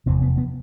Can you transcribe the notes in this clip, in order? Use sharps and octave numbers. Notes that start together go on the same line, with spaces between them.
F1 E2 C3 C4
B3
B3